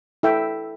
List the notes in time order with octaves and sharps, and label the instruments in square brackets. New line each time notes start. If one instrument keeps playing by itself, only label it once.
[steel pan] E4 A4 E5 G5